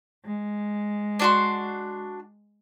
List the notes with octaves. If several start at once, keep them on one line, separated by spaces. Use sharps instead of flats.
G#3
D4 F#4 C6